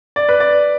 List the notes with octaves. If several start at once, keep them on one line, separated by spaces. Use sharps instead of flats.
D5
B4
D5